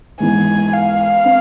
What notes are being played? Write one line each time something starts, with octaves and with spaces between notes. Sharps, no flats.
G#2 E3 B3 G#5
F5
C4